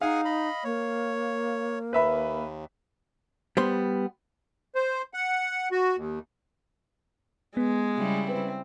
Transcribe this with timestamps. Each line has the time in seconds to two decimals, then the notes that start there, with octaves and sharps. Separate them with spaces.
0.01 D#4 G#4 F5 F#5 G#5
0.25 D#5 B5
0.64 A#3 C#5
1.93 D#2 B4 E5 B5
3.57 G3 B3 C5 C6
4.75 C5
5.14 F#5
5.72 F#4
5.96 D#2
7.57 G#3 B3
7.97 C#3 G3 E4
8.29 C4 B4